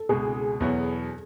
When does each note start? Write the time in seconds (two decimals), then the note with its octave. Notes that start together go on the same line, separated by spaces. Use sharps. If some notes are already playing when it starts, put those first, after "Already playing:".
Already playing: A4
0.09 C#2 B2 G#3 G#4
0.60 E2 B2 F#3 B3